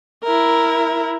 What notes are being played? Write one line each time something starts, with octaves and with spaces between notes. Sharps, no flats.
E4 A#4